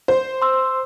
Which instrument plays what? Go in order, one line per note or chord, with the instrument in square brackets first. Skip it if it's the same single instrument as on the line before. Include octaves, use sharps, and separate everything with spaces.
[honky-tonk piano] C5
[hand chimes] C6 E6